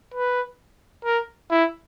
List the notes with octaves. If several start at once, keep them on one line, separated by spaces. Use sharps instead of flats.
B4
A#4
E4